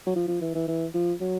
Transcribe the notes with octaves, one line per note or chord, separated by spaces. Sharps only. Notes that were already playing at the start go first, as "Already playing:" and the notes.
F#3
F3
F3
E3
E3
E3
F3
F#3